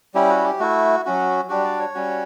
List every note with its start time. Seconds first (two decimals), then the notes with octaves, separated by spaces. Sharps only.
0.14 G3 C#4 E4 G4
0.30 F#4
0.45 G4
0.60 A3 E4 F#4
1.05 F#3 C#4 F#4
1.49 G3 D4 F#4 G4
1.64 D5
1.79 C#5
1.94 G3 C#4 F#4